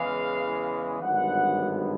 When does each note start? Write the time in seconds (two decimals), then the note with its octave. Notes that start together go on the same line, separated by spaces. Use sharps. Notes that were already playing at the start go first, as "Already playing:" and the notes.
Already playing: E2 C#3 E3 G#3 F5
1.02 G#1 G2 D3 F#3 B3 F#5